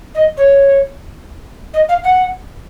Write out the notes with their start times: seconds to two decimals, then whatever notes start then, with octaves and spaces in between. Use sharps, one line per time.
0.14 D#5
0.37 C#5
1.73 D#5
1.88 F5
2.03 F#5